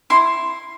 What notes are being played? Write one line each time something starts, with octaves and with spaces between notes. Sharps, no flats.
E4 C6